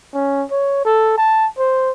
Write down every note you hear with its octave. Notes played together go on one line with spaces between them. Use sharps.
C#4
C#5
A4
A5
C5